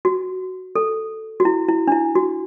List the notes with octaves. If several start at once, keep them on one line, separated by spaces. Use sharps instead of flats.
F#4
A4
F#4
E4
E4
D4
E4
F#4